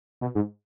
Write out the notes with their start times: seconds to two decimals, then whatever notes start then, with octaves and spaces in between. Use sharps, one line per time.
0.21 B2
0.35 G#2